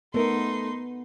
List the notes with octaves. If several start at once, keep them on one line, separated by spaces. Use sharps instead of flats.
A3 B3 D#4 A#4 C6